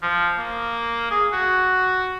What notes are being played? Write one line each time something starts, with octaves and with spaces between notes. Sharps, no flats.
F3
A#3
G#4
F#4